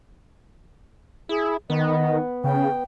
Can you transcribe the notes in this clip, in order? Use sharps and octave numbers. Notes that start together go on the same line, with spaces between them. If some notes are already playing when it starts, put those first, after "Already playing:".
E4 G#4
D#3 B3 D#5
C#3 G5